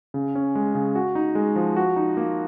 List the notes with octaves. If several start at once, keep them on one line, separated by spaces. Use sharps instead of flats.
C#3
C#4
G#3
C#3
F#4
D#4
G#3
F3
F#4
D#4
A#3